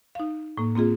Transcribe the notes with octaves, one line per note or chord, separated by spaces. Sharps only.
D#4 F5
A2 A#3
A#3 C4 F4 G#4